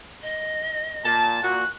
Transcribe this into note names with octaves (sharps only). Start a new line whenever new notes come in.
D#5
A#2 A5
A#2 F#4 F#6